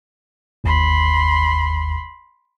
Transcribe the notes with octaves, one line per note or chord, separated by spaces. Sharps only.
G1 D#2 B5 C6